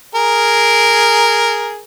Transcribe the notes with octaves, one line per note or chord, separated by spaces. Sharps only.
G#4 A#4